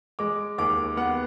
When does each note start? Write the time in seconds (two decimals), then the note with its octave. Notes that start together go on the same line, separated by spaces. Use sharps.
0.19 G#3 D6
0.58 D#2 D6
0.97 B3 F#5